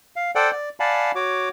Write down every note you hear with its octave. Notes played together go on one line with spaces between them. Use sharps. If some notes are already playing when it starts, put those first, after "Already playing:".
F5
A4 C5 D5 F#5 G5
D5
D5 F5 F#5 G#5 A5 B5
F#4 C#5 D6